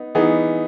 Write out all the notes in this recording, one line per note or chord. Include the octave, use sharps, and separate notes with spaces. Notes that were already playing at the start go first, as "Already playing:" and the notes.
Already playing: B3 D#4
E3 B3 D#4 G#4